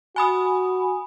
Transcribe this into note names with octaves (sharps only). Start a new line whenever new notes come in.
F#4 G#5 B5 D#6